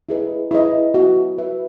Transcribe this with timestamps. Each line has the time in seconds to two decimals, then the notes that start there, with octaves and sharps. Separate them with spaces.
0.09 E4 G#4 B4 D#5
0.51 E4 G#4 B4 D#5
0.94 F#4 B4 E5
1.38 F#4 B4 E5